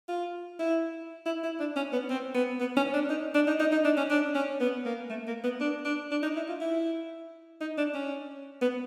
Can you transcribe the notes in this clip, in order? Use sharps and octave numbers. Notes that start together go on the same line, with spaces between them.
F4
E4
E4
E4
D4
C#4
B3
C4
B3
B3
C#4
D4
D#4
D4
D#4
D#4
D#4
D4
C#4
D4
C#4
B3
A#3
A3
A#3
B3
D4
D4
D4
D#4
E4
F4
E4
D#4
D4
C#4
B3